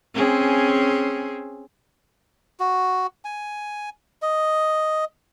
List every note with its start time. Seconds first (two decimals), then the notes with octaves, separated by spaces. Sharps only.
0.14 C4 C#4 G#4
2.60 F#4
3.25 G#5
4.22 D#5